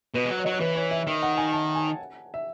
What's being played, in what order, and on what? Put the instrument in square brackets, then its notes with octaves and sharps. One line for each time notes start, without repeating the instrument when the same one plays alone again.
[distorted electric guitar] B2 [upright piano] B4
[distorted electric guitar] G#3
F#3
[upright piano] C#5
[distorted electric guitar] F#3 [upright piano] D#5
[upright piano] C#5
[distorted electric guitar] E3 [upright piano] B4
[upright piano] C#5
E5
[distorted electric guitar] D#3 [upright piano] E5
[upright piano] F#5
G#5
A5
G#5
E5